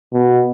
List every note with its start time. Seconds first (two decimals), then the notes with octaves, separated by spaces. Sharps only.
0.13 B2